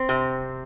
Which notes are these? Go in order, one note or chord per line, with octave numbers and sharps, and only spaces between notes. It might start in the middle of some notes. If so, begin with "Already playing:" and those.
Already playing: C4
C3